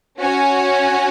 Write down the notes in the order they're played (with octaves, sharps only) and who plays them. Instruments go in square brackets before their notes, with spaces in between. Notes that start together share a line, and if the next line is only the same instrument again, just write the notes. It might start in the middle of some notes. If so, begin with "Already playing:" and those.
[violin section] C#4 F#4 C#5 G#5